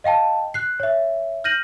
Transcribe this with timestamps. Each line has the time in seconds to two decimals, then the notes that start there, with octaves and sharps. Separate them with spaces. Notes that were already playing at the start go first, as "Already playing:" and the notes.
0.04 D#5 F5 G5 A5
0.54 F#6 C7
0.80 C#5 E5
1.44 F6 G6 A#6 D#7 F#7